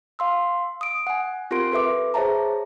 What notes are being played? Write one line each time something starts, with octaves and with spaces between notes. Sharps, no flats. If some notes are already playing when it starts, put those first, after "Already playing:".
F5 C6 E6
D#6 D7
F#5 G#5
C4 F4 G4 A#4 C6 D7
A4 B4 E5 D6
G#4 C5 C#5 E5 A5 A#5